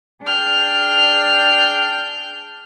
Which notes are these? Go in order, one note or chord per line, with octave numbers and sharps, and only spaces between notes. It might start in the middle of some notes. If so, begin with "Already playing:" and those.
D4 G#4 G5 F6 G6